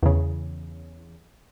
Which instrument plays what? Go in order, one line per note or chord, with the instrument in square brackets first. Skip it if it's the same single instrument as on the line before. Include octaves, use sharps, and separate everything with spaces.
[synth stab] E2 C#3